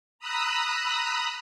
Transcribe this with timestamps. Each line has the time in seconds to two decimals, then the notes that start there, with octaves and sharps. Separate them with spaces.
0.19 A#5 B5 D#6 E6 F#6